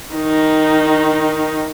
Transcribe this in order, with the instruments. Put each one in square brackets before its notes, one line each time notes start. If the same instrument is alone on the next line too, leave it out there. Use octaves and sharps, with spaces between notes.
[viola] D#3 D#4